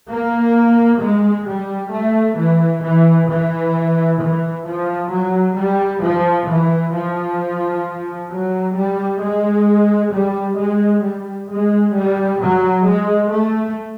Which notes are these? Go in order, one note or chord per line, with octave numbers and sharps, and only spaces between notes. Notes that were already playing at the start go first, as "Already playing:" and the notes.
A#3
G#3
G3
A3
E3
E3
E3
E3
F3
F#3
G3
F3
E3
F3
F#3
G3
G#3
G3
G#3
G3
G#3
G3
F#3
G#3
A3